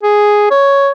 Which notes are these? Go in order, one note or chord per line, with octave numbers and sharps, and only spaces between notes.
G#4
C#5